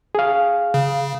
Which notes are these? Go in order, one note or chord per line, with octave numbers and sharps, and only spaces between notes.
G#4 F5
C#3